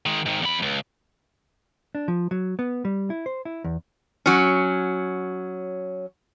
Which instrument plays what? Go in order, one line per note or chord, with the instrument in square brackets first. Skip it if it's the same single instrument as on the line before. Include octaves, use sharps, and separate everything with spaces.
[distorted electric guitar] D#3 G#3
G#2 D#3
E2 B5
C#2
[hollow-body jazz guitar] D4
F3
F#3
B3
G3
E4
C5
E4
E2
[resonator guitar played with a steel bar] F#3 C#4